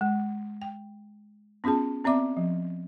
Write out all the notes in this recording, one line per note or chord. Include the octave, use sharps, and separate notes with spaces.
G#3
G5
B3 C#4 F4 G#4 A5
B3 C4 D5 E5 D6
F3